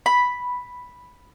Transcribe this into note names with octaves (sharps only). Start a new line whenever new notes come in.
B5